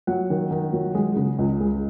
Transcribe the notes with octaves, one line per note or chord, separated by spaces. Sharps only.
F#3 F#5
D#3
D#3
F#3
G#3
C#3
C#2
G#3